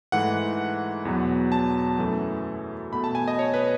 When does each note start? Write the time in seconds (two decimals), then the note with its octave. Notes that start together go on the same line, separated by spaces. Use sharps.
0.12 G#2 E3 A3 F#5
1.05 E2 B2 F#3
1.52 A5
1.99 F#2 E3 A3
2.93 B2 A3 B5
3.04 A5
3.15 G#5
3.28 D#5
3.39 C#5
3.54 B4